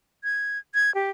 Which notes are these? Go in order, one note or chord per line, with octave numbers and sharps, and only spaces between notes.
G#6
G#6
G4